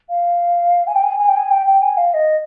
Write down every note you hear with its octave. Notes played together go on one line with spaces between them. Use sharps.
F5
G#5
G5
G#5
G#5
G5
G#5
G5
G5
G#5
F5
D#5